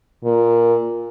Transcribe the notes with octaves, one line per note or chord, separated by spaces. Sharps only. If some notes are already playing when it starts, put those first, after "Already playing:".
A#2